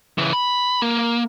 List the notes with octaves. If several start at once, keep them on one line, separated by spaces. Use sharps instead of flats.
C#3 E3
B5
A#3